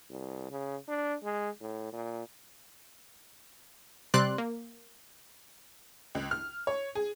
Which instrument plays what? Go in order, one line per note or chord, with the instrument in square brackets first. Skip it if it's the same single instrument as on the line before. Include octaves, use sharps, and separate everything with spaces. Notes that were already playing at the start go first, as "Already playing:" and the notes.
[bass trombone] C2
C#3
D4
G#3
A2
A#2
[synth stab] C3 G3 C4 D5 C6 F#6
A#3
[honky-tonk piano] C#2
F6
C#5
G#4